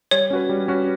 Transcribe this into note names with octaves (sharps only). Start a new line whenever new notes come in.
G3 C#5
C#4 F#4 B4
G3
C#4 F#4 B4